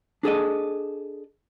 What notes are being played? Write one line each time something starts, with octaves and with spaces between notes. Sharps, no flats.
D4 G#4 A4 D#5